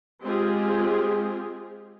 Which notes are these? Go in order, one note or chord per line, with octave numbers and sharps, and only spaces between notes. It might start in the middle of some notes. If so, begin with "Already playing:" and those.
G#3 C4 F4 G4 G#4